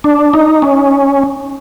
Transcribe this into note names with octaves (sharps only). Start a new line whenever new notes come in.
D4
D#4
C#4